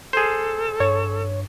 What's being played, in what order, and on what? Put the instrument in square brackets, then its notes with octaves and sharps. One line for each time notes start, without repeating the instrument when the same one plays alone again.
[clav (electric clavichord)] G#4 C5 [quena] A4
[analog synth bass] G2 [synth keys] C#5